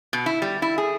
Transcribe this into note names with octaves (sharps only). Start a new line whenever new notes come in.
B2
E4
G3
E4
G#4